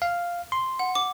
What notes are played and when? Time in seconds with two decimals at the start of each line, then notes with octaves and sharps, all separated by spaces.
0.02 F5
0.52 C6
0.79 F#5
0.95 D6